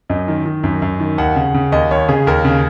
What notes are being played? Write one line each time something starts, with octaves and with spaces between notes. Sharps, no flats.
F#2 D#5
D#3
D#3
F#2
F#2
D#3
D#2 F#5
C#3
C#3
D#2 D#5
D#2 C#5
C#3 G#4
D#2 A#4
C#3